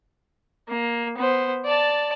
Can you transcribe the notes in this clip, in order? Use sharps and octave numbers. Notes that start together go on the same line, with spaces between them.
A#3
B3 C5
D5 A5